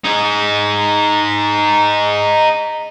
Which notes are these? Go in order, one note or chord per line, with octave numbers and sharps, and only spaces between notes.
D#4 G#4